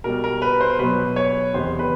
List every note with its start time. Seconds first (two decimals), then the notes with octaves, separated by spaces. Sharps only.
0.04 B2 G3 A#4
0.24 A#4
0.42 B4
0.61 C5
0.79 B2 F#3 B4
1.16 C#5
1.54 E2 C3 D#3 C5
1.79 B4